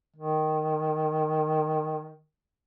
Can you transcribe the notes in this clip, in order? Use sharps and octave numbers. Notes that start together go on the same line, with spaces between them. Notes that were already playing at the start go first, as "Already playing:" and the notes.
D#3